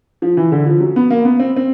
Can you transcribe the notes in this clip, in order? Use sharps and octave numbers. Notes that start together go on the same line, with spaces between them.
F3
E3
D3
F3
F#3
B3
A#3
B3
C4
C4